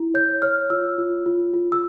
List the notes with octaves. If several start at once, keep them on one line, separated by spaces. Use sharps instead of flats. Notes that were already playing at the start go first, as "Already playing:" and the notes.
Already playing: E4
C#5 G6
C#5 F6
F4 E6
F4
F4
F4
E6